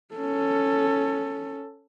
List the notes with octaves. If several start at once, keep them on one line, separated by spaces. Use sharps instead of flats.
C#4 A4